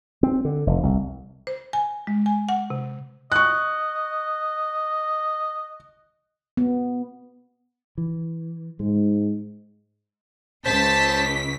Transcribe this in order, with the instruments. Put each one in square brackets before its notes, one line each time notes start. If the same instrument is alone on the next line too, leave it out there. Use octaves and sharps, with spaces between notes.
[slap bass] C4
D3
F1
C2
[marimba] C5
G#5
G#3
G#5
F#5
C3
[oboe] D#5 [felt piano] C#6 F#6
[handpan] B3
[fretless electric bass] E3
[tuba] G#2 [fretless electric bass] G#3
[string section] C#2 B6 [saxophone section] C5 [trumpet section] A5